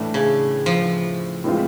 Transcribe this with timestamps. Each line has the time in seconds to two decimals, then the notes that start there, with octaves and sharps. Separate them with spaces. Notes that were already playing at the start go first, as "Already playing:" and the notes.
Already playing: A2 E3 A3 D4
0.14 C#3
0.66 F3
1.44 A2 E3 G#3 C4 F4